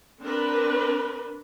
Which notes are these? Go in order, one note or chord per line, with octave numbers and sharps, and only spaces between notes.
C4 D4 A#4 B4